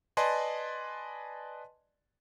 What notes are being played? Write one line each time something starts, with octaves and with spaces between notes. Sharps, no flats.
B4 D5 D#5 G#5 A5 C6